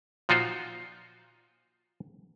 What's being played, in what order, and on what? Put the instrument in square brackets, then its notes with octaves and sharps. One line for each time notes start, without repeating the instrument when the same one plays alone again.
[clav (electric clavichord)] A#2 F3 D#4 F4 F#4 C5